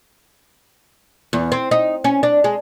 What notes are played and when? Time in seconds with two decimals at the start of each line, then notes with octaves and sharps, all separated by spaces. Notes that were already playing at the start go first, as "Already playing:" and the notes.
1.33 E2
1.52 C4
1.71 D#4
2.04 C#4
2.23 D4
2.44 G#3